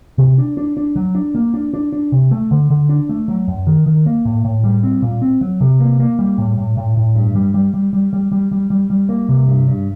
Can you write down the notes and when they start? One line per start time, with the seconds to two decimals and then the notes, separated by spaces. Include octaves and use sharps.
0.18 C3
0.38 D4
0.57 D4
0.77 D4
0.96 F#3
1.15 D4
1.35 A#3
1.54 D4
1.74 D4
1.93 D4
2.12 C3
2.31 A3
2.51 D3
2.70 D3
2.89 D4
3.09 A3
3.28 F#3
3.48 F#2
3.67 D#3
3.86 D#3
4.06 A#3
4.25 A2
4.45 A2
4.64 G3
4.83 C4
5.02 A#2
5.22 C4
5.41 F#3
5.61 C3
5.80 A#3
6.00 A#3
6.19 G3
6.38 A2
6.58 A2
6.77 A2
6.97 A2
7.16 G2
7.35 G3
7.54 G3
7.74 G3
7.93 G3
8.13 G3
8.32 G3
8.51 G3
8.70 G3
8.90 G3
9.09 A#3
9.29 C3
9.48 G2
9.68 G2